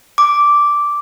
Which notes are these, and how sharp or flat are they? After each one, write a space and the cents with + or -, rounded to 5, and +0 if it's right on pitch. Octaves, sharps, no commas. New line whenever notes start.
D6 -5